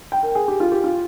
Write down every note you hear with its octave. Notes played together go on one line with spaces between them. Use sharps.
G5
A#4
G#4
G4
F4
G4
F4